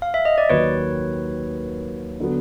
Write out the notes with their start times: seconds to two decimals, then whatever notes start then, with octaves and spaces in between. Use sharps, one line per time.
0.02 F5
0.14 E5
0.25 D#5
0.38 D5
0.49 D#2 D#3 F#3 B4 C#5
2.20 D3 F#3 B3